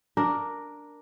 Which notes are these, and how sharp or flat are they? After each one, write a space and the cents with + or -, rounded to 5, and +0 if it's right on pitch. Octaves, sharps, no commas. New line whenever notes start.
D4 +0 A#4 +0